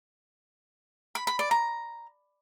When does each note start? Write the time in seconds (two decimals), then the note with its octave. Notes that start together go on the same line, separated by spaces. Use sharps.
1.15 B5
1.27 B5
1.39 D5
1.51 A#5